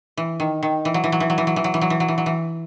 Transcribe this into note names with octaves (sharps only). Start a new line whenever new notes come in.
E3
D#3
D#3
E3
F#3
E3
F#3
E3
F#3
E3
F#3
E3
F#3
E3
F#3
E3
F#3
E3
F#3
E3